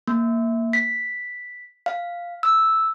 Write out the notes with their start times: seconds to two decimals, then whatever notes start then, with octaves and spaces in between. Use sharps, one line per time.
0.07 A#3
0.73 B6
1.86 F5
2.43 E6